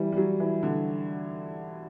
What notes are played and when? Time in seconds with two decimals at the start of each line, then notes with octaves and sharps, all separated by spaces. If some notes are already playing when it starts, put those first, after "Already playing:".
Already playing: E3 G3
0.12 G3
0.17 F#3
0.40 E3
0.63 D3